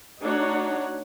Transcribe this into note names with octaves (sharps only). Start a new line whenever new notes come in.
A3 D4 D#4 F#4 C#5 F#5